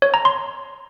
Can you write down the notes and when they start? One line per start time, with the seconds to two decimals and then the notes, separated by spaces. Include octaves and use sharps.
0.02 C#5
0.14 A#5
0.25 C6